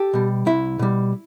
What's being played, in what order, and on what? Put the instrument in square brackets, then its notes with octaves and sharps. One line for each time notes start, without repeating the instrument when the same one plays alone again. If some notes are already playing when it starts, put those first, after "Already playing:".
Already playing: [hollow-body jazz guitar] G4 A4
B2 G3
C2 E4
B2 G3